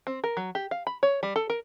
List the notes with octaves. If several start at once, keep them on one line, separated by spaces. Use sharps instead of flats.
C4
A#4
F#3
G4
F5
B5
C#5
G3
A4
A#4